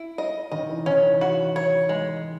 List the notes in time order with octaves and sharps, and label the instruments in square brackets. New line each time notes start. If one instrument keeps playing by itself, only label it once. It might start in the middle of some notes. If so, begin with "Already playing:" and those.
Already playing: [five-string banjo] E4
D#5
[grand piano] D#3 [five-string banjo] D#5
[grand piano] E3
[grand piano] D#3 [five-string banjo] C#4
[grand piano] E3
[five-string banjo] F#4
C#5
G#3